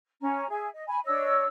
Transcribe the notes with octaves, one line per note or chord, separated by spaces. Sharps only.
C#4 A#5
G#4 E5
D#5
G#5 B5
D4 C#5 D#5 E6